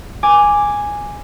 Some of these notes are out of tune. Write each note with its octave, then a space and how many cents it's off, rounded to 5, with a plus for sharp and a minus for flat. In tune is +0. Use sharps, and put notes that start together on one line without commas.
G#5 -5 D6 +0